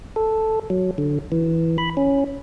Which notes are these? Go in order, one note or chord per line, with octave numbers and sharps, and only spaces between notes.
A4
F#3
D3
E3
B5
C#4